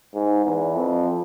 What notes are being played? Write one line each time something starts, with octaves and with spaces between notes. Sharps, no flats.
G#2
E2
F2